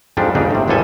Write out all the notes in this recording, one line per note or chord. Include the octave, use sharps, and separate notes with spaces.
F2 G#2 F3 G3 D4
G1 G#2 C#3 D4 D#4 G5
A2 C3
G#1 E2 F3 G3 A4 G#5